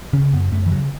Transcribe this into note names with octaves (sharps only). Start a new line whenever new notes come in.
C#3 C#4
F#2 B3
F#2 A3
E3
C#3 F#3